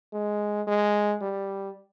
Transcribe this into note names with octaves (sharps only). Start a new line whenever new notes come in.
G#3
G#3
G3